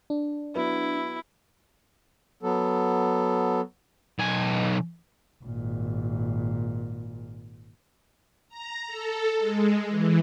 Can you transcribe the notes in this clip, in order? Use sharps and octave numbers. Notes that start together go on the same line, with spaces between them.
D4
F#3 B3 E4
F#3 B3 A4
B1 G#5
G#1 A#2
A#5
A4
G#3
E3